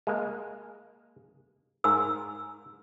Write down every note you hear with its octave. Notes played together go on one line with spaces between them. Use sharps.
G#3 A#3
G#2 A#4 E6